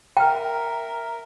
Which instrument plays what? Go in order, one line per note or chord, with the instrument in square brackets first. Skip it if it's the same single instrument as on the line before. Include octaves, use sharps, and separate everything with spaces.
[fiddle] A#4 E5 [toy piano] G5 [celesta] A#5 F6